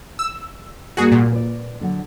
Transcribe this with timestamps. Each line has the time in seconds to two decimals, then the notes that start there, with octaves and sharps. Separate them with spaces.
0.19 E6
0.97 G#2 G3 A#3 F#4 G#4
1.12 A#2
1.32 B4 D5
1.81 D3 F#3